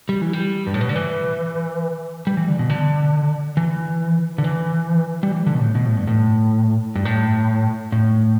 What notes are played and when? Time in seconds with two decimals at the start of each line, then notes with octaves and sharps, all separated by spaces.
0.09 G3
0.21 E3
0.33 G3
0.67 G2
0.74 A2
0.81 B2
0.89 D3
0.96 E3
2.27 G3
2.37 E3
2.48 D3
2.59 B2
2.70 D3
3.57 E3
4.38 D3
4.44 E3
5.23 G3
5.32 E3
5.47 D3
5.54 B2
5.60 A2
5.75 B2
5.86 A2
5.97 G2
6.07 A2
6.96 G2
7.05 A2
7.92 A2